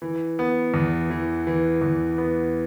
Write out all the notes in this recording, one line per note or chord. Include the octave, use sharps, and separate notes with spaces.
E3
B3
E2
E3
E3
E2
B3